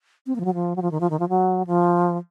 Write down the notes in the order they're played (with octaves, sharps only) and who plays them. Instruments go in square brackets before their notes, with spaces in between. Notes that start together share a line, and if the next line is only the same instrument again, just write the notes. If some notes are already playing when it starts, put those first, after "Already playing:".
[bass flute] C4
A#3
F3
F#3
F3
F#3
F3
D#3
F3
D#3
F3
F#3
F3